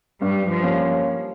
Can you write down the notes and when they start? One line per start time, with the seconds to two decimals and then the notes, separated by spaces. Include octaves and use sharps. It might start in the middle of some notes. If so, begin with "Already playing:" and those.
0.21 G2 G3
0.49 F3
0.63 G3 A#3 C#4